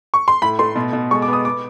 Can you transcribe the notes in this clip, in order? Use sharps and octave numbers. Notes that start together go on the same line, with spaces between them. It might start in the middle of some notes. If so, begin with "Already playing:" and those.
C#6
C6
A2 B5
A3 C6
B2
B2
G#3 C#6
D6
B3
D#6
B3 D6